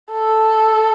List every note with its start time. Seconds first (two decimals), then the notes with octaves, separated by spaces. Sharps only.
0.13 A4